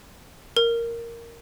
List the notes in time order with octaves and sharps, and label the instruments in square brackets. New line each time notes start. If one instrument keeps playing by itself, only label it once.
[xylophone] A#4